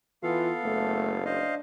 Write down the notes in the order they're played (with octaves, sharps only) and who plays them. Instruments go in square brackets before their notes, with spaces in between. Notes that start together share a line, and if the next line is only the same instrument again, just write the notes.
[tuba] E3 [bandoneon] B3 A4 F5 [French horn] F4
[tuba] F#1 [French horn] A3
[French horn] D4 [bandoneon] C5 D#5 F5